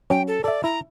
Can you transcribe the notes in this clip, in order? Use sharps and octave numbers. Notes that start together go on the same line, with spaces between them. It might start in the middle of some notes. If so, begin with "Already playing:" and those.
F#3 C#4 G5
A4
A4 D5 E5
E4 A#5